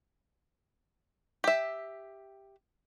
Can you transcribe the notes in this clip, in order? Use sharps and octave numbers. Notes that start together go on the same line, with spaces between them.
G4 E5